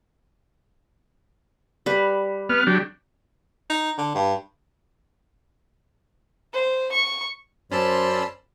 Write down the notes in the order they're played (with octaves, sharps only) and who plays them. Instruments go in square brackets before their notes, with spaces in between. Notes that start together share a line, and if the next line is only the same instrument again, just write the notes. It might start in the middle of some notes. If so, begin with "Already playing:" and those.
[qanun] G3 B4
[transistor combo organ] B3 F6
F#3 D4 G4
[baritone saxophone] D#4
D3
G2
[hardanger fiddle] C5
C#6
[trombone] F#2 [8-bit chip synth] C#4 A5 E6 [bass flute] C5 [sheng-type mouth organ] D5 B5 C6